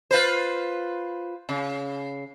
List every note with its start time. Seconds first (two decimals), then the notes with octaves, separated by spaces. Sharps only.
0.11 F4 B4 C5
1.49 C#3